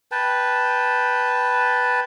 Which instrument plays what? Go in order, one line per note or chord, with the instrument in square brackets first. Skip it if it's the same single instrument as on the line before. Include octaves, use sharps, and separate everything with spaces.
[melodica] B4 G5 A5